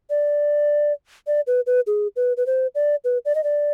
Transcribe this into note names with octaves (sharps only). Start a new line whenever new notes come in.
D5
D5
B4
B4
G#4
B4
B4
C5
D5
B4
D5
D#5
D5